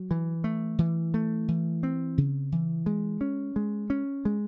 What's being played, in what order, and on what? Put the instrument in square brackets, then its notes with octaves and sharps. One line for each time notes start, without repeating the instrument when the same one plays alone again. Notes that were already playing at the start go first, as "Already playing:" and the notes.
Already playing: [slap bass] F#3
E3
A3
E3
A3
E3
C4
C#3
E3
G#3
C#4
G#3
C#4
G#3